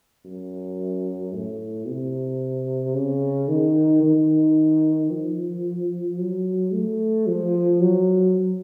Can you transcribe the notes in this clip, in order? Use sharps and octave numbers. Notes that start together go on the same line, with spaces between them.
F#2
A2
C3
C#3
D#3
D#3
F3
F#3
A3
F3
F#3